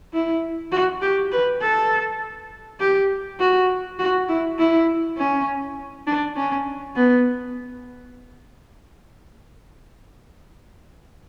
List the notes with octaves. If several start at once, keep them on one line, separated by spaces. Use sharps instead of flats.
E4
F#4
G4
B4
A4
G4
F#4
F#4
E4
E4
C#4
D4
C#4
B3